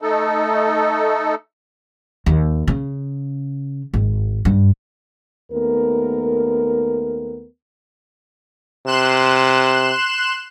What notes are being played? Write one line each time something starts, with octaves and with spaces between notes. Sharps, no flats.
A3 D#4 A4
D#2
C#3
G#1
G2
D#2 A3 B3 A#4
C3 C6 F#6 E7